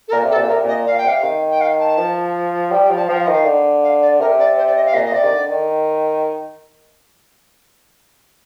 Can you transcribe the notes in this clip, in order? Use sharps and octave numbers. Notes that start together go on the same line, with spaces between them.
A4
A#2 A#4
C3
A4
A#2
A4
C3 A#4
A#2 D#5
A#2 F5
G5
C3 F5
D#3
G5
F5
A5
F3
G3 G5
G5
F3
A5
F3 G5
F5
D#5
D#3 F5
D3
F5
D5
C3 A#4
D5
C5
D5
D#5
F5
A#2 D#5
D#5
C3 D5
D#3
D3
D#3